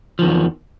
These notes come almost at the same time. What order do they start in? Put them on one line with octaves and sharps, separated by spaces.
F3 D#3 E2